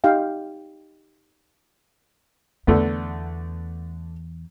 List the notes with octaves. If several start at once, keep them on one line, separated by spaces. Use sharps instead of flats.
D#4 G4 F5 G5
E2 D3 A3 B3